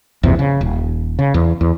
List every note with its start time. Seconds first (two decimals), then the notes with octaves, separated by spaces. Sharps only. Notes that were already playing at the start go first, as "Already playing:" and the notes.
0.23 A#1 E2 G2 C3
0.39 C#3
0.61 D#1
1.19 C#3
1.34 E2
1.61 E2